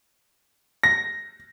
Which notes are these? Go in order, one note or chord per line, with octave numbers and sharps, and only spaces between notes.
A#6